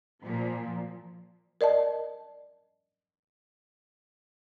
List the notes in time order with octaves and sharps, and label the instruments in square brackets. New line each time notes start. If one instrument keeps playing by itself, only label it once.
[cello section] A#2 F3
[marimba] A#4 D5 D#5 A5